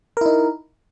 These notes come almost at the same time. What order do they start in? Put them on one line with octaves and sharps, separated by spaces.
A#4 E4 D#4